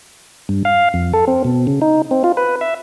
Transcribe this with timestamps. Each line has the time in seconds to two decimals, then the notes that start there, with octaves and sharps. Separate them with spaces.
0.49 G2
0.65 F5
0.94 F2
1.13 A4
1.28 C4
1.44 B2
1.67 C#3
1.81 D#4
2.11 C4
2.24 F4
2.37 B4
2.61 E5